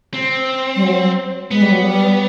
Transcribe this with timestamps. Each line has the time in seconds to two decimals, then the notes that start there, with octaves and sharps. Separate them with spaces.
0.14 C4
0.76 G3
0.83 F#3
1.51 G#3 B3
1.62 G3
1.72 F#3
1.82 G3